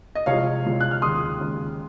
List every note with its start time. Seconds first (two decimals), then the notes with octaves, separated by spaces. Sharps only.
0.15 D#5
0.26 C2 C3 F3 G#3 C#5 F5
0.65 C2 C3 F3 G#3
0.80 F#6
0.91 F6
1.02 D#2 C#3 G#3 C6 D#6
1.40 D#2 C#3 G#3